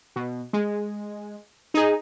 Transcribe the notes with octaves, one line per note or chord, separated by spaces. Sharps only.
B2
G#3
D#4 G#4